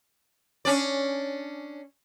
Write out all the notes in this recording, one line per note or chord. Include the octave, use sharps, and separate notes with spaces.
C#4 D4 D5